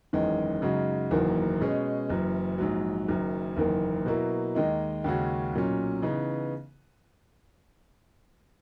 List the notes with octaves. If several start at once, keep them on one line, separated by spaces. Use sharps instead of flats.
F#1 E2 D#3 G#3 C#4
F#2 C#3 G#3 D#4 F#4
F#1 E2 D#3 F#3 A#3
B2 G#3 C#4 G#4
F#1 F#2 E3
A#1 G#2 F#3
F#1 F#2 D#3
F#1 E2 D#3 A#3
B2 F#3 A#3 E4
D#2 D#3 G#3 D#4
D#2 C#3 G#3 C#4 F#4
B1 A#2 F#3 C#4
C#3 E3 B3 D#4